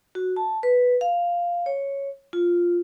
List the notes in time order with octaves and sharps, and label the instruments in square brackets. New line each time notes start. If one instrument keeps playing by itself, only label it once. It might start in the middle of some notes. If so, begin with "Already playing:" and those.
[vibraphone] F#4
A5
B4
F5
C#5
F4